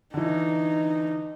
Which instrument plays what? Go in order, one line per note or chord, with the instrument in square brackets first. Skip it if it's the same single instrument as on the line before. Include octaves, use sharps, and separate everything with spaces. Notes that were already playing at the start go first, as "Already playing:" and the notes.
[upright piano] D3 E3 [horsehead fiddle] D#4